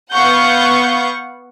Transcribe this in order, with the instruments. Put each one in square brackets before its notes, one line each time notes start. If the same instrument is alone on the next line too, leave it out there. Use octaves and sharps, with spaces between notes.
[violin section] B3 F5 F#5 C#6 G6